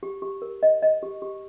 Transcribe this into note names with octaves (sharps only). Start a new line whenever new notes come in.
G4
G4
A#4
D#5
D#5
G4
G4